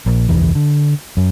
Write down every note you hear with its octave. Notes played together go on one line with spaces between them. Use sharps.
A#1
F#1 B1 E2 E3
D3
F#2